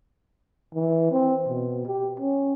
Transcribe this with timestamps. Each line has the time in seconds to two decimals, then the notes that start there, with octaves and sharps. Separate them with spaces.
0.74 E3
1.12 C4
1.47 B2
1.87 G4
2.20 C#4